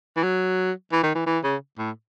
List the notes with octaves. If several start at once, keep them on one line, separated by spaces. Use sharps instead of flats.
E3
F#3
E3
D#3
E3
E3
C#3
A2